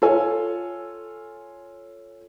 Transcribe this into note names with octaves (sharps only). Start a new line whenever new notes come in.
F4 A4 C#5 G#5